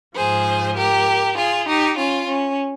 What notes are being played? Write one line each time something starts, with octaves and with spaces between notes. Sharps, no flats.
G#2 F3 G#4 C5
G4 A#4
F4 G#4
D#4 G4
C#4 F4
C#4